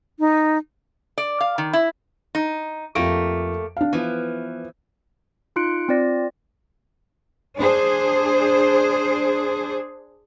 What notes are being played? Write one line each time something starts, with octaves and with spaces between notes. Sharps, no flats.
D#4
D5
F5
D#3
E4
D#4
F2 A3 A#3 G4 D7
D4 F5
E3 F3 B3
D#4 F4 C6 F#6 C#7 D7
C4 F4 D5 A#6
D4 G#4 C5